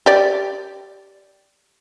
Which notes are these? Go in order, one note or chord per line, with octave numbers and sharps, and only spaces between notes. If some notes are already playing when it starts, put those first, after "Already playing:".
G4 D5